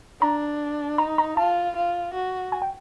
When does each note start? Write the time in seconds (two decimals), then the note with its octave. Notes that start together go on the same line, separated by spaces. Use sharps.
0.21 D4 A#5
0.98 D#4 A#5
1.18 A#5
1.37 F4 A5
1.76 F4
2.14 F#4
2.52 G#5
2.62 G5